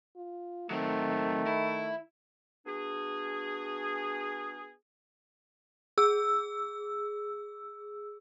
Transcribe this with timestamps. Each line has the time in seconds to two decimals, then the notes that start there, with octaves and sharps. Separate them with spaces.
0.16 F4
0.71 D#3 F#3 A3 C4
1.47 E4
2.66 B3 D4 F#4 G#4
5.98 G#4 E6